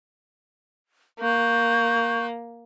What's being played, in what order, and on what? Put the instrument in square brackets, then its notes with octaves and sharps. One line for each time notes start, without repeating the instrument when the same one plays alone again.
[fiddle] A#3 [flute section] C#6 F#6 G6